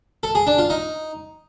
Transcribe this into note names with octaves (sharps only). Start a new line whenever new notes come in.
A4
G#4
D4
F4
D#4